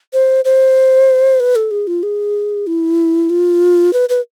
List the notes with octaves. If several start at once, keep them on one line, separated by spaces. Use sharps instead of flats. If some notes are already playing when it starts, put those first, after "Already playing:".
C5
C5
B4
A4
G#4
F4
G#4
E4
F4
B4
B4